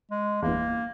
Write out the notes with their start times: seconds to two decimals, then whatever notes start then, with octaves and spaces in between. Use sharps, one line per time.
0.11 G#3
0.43 G1 E2 A#3